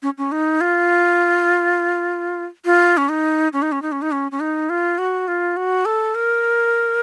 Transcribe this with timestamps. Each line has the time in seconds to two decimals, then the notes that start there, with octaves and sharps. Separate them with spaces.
0.02 C#4
0.18 C#4
0.32 D#4
0.61 F4
2.65 F4
2.97 C#4
3.09 D#4
3.53 C#4
3.62 D#4
3.72 C#4
3.82 D#4
3.92 C#4
4.02 D#4
4.12 C#4
4.32 C#4
4.40 D#4
4.70 F4
4.98 F#4
5.28 F4
5.57 F#4
5.85 A4
6.15 A#4